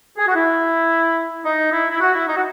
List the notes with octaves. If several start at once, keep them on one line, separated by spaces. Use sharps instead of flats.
G#4
F#4
E4
D#4
E4
E4
F#4
E4
D#4
F#4